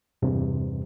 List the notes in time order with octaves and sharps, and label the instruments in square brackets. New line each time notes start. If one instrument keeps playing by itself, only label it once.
[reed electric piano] E2 G2 C3